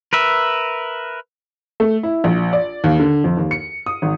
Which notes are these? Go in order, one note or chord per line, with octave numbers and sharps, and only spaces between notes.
A#4 B4 E5
A3
E4
A#1
D5
D#2
D3
F2
D#2
C#7
D#6
G#1